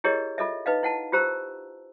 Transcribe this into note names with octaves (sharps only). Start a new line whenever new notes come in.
E4 G4 G#4 A#4 C#5 D#5
F4 A4 D#5 E5
D#4 B4 D#5 F5
E4 F#5 A5
F4 G4 C5 A#5 E6